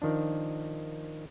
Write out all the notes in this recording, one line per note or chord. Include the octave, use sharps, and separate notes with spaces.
D#3 F3 D4